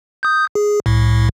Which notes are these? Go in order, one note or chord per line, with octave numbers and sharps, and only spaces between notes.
D#6 G6
G#4
C2 A2